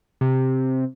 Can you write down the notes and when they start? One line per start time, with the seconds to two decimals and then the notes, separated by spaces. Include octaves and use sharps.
0.21 C3